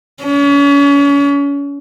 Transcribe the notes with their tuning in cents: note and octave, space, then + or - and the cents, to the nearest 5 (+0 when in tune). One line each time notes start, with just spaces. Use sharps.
C#4 +35